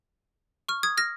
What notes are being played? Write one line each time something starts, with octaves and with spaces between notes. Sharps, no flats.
C#6 F6
D#6 G#6
F6 A#6